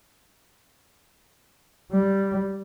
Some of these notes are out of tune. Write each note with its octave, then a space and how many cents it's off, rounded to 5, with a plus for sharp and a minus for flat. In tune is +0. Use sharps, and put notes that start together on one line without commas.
G3 -5